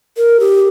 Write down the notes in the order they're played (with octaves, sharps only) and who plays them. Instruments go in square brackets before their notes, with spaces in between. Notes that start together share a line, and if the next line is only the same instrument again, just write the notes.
[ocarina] A#4
G4